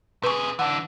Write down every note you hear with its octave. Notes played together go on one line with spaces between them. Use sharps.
C3 G#4 B4 C#6
E3 D4 F#5